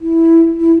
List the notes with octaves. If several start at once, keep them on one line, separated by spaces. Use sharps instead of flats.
E4
E4